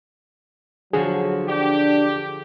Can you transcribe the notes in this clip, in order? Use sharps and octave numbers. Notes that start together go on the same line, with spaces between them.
D3 F3 F#3 F#4 G#4
D4 G4